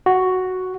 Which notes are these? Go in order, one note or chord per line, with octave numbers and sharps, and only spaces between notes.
F#4